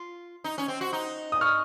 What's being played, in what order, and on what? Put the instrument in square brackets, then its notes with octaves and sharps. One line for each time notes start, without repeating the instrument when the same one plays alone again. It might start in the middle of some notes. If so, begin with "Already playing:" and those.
Already playing: [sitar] F4
D#4
C#4
C4
F#4
D#4
[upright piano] D#6
C#6 F6